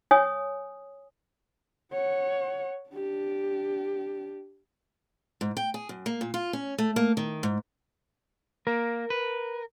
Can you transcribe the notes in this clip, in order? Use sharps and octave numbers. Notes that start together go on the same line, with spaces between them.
C#5 G#5 D#6
C#5 F#5
D4 G4
G#2
G5
G#4
F#2
A#3
A#2
F4
C#4
A3
A#3
D#3
G#2
A#3 A#4
B4